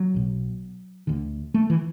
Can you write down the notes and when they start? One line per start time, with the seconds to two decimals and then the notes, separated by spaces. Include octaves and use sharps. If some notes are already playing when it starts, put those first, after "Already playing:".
Already playing: F#3
0.14 B1 B2
1.07 D2 D3
1.54 A3
1.70 E3